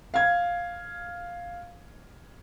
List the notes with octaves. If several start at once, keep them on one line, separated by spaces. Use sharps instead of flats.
F5 G#6